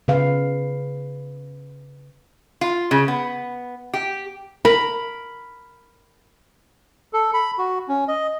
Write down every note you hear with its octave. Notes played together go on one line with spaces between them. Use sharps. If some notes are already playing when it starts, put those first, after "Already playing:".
C#3 B4 F5
F4
C#3
B3
G4
A#4 B5
A4
B5
F#4
C#4
D#5